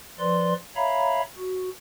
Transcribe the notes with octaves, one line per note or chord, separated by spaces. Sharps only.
F3 B4 D5 C6
C#5 E5 F5 A#5 B5
F#4